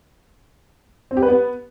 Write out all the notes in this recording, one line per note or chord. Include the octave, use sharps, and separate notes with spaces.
C4
G4
B4
B3